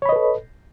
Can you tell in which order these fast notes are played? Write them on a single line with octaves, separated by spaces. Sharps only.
C#5 B5 D#5 B4 A4